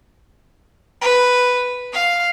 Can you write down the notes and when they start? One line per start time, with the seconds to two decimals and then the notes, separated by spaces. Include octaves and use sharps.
1.02 B4
1.94 F5